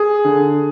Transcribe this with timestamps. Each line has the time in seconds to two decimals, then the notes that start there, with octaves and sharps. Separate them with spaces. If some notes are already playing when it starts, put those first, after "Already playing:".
Already playing: G#4
0.25 D3